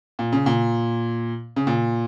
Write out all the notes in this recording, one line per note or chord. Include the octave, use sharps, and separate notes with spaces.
A#2
C#3
A#2
C#3
A#2